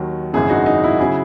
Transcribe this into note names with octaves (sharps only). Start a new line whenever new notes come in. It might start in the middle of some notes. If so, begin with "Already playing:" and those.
Already playing: D#2 D#3 F#3
G#1 F#2 C#3 E4 G#4
D#4 F#4
D#4
E4
C#3 F#3 E4 G#4